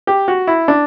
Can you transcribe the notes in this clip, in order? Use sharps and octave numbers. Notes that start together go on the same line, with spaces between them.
G4
F#4
E4
D4